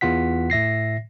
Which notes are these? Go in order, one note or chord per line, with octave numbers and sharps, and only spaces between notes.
E2 E3 F4 F#5 B6
A2 E5 A#6 C7